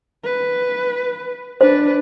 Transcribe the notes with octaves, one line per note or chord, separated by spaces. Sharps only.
B4
D4 B4 C5